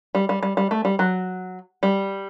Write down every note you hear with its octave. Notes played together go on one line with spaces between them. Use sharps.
G3
G3
G3
G3
A3
G3
F#3
G3